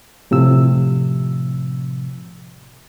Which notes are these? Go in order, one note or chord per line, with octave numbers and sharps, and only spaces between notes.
A2 C3 F3 E6